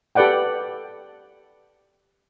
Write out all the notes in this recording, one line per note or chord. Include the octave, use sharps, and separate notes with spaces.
G4 A4 B4 D5 F#5 G5